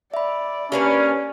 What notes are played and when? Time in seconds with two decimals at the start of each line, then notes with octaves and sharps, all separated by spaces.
0.14 D5 E5 B5
0.72 A#3 C#4 D4 G4 B4